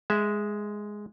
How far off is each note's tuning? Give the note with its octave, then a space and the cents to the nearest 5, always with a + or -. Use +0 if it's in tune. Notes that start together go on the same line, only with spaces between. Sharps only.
G#3 +0 E5 -10